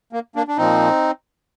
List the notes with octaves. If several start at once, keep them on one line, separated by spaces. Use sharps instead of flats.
A#3
A#3 D4
D4
A#2 F3 C4 D#4